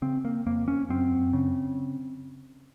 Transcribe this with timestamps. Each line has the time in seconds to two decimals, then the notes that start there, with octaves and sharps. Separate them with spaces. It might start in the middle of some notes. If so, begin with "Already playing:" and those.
0.02 C#3 C4
0.25 A#3
0.46 F2 A#3
0.68 C#4
0.89 F#2 C4
1.33 C#3